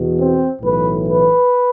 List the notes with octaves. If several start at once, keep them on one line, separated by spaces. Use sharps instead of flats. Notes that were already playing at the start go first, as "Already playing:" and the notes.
Already playing: E2 B2
C4
B1 A2 E3 B4
B4